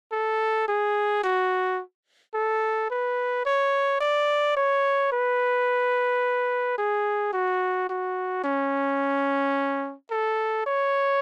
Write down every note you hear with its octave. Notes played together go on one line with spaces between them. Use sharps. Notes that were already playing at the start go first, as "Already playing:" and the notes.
A4
G#4
F#4
A4
B4
C#5
D5
C#5
B4
G#4
F#4
F#4
C#4
A4
C#5